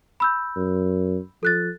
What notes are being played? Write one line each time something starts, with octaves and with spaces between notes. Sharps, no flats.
B5 E6 G6
F#2
F3 A4 F#6 A6